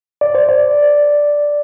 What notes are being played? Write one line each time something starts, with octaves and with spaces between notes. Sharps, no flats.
D5
C5
D5